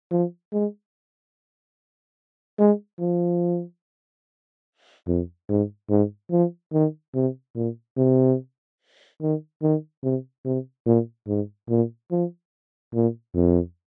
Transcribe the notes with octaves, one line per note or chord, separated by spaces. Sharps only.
F3
G#3
G#3
F3
F2
G#2
G#2
F3
D#3
C3
A#2
C3
D#3
D#3
C3
C3
A#2
G#2
A#2
F3
A#2
F2